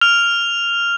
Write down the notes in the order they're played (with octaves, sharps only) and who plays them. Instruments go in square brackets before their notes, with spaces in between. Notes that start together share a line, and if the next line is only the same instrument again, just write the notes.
[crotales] F6 F7